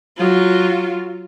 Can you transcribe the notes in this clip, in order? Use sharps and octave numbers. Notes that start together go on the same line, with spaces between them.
F#3 F4